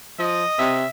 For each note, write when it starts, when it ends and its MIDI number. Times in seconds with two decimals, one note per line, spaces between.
0.19 0.44 53
0.19 0.79 75
0.59 0.84 48
0.59 0.89 76